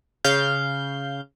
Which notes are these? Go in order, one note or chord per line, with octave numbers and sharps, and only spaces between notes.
C#3 F5 G6